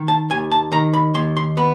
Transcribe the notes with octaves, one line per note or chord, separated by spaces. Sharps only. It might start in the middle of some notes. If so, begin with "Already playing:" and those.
Already playing: D#3
A5
D#2 G#5
A5
D#3 A#5
B5
D#2 C6
C6
B3 B5